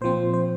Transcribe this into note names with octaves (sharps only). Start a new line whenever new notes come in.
A#2 F3 C4 C5
C5